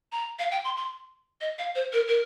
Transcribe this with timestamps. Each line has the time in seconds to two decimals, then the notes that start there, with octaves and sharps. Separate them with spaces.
0.12 A#5
0.39 F5
0.51 G5
0.64 C6
0.77 C6
1.41 D#5
1.59 F5
1.75 C5
1.93 A#4
2.08 A#4